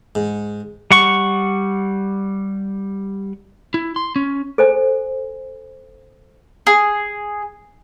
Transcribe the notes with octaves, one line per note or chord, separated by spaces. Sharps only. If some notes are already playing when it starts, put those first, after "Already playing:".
G#2
G3 F#5 C#6
E4
C6
C#4
A4 C5 G#5
G#4